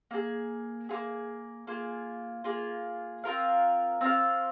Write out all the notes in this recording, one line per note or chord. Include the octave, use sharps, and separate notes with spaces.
A#3 F4 G#4
A#3 F4 G#4
A#3 F4 G#4
A#3 F4 G#4
C4 F4 A#4 F5
C4 F4 A#4 F5